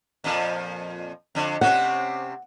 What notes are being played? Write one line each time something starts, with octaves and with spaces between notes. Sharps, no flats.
F2 A#2 F3
F2 D3
C3 C4 C#4 F#5